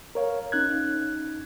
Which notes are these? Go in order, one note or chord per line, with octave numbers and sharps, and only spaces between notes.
A#4 C#5 F5
C#4 D#4 F#6 G#6